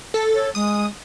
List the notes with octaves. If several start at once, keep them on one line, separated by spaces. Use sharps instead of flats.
A4
C#5
G#3 D#6